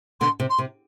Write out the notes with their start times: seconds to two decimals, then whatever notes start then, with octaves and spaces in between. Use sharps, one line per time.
0.20 B2 D3 C6
0.40 C3
0.49 C6
0.58 C3